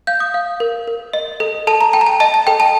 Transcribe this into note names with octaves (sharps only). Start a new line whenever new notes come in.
F5 G6
D#6
F5
A#4
A#4
D#5
A4
A4 A5
A#5
G5 A5
A#5
A5
D#5 A5
A5
A4 G5
A5